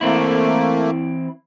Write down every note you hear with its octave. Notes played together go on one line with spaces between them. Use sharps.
E3 A3 A#3 C4 E4